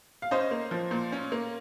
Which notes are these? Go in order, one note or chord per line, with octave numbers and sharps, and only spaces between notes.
F5
C#4 C5 D#5
A#3
F3
A#2
C#4
A#3